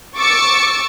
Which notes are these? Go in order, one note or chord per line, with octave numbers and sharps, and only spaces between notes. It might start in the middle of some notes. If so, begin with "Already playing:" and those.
C#6 D6 E6 A6 C#7